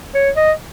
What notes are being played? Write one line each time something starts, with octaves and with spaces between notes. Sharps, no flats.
C#5
D#5